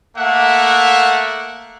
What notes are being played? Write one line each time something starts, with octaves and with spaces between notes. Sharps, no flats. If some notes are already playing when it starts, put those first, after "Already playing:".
A3 A#3 E5 F#5